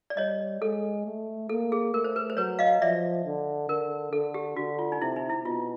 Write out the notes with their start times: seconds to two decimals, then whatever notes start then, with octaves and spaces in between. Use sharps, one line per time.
0.10 D5
0.17 G3 C#5 D#5
0.61 G#3 A4
1.06 A3
1.49 A#3 A4
1.72 G#4
1.94 A3 A#4
2.04 C5
2.16 B4
2.30 C5
2.37 F#3 B4 C#5
2.59 D#5 F5
2.82 F3 D5 E5
3.25 D3
3.69 D3 A#4
4.13 D3 A4
4.34 G4
4.56 D3 F#4
4.79 F4
4.92 D#4
5.02 C3 E4
5.16 D#4
5.30 E4
5.44 B2 F4